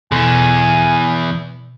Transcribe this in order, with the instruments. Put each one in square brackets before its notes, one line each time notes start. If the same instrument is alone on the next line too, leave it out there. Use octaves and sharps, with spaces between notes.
[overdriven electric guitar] E2 E3 [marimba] B2 [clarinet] G#5